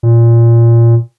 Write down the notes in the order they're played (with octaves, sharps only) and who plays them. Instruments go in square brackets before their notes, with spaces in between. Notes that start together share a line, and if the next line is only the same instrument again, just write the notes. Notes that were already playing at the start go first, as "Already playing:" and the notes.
[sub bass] A#2